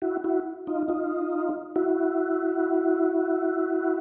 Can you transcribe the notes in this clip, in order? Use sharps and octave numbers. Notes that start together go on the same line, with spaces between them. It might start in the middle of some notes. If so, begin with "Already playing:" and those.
E4 F#4
E4 F#4
D#4 F4
D#4 F4
E4 F#4